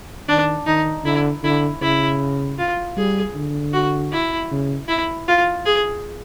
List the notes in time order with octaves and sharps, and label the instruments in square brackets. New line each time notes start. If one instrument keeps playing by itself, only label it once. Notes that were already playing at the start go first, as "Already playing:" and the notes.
[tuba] D#3 [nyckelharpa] D4
[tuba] D#3 [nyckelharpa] D#4
[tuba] D3 [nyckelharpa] E4
[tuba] D3 [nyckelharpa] E4
[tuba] C#3 [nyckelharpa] E4
[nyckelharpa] F4
[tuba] G3 [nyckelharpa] G#4
[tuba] D3
[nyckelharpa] F#4
E4
[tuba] C#3
[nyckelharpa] E4
F4
G#4